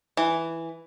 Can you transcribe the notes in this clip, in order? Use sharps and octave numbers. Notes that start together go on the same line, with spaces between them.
E3